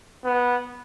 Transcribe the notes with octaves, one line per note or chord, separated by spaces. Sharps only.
B3